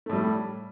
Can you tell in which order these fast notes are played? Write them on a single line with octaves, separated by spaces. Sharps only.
A3 A2 G3